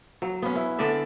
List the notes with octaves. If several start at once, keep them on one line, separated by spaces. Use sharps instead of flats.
F#3
B3 C#4
E4
D3 C#4 D5 E5